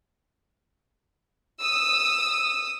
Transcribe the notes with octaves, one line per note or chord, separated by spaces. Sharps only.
D#6 E6